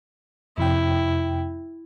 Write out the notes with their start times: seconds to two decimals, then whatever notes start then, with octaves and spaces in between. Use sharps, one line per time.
0.58 F2 C3 E4 G5